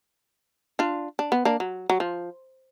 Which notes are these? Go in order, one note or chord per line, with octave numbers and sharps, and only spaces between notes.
D4 F4
D4
B3
A#3 D4
F#3
F#3
F3